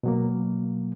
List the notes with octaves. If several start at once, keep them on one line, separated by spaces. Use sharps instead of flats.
B2 F#3 A#3